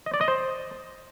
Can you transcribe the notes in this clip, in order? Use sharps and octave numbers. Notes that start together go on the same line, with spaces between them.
D#5
D5
D#5
C5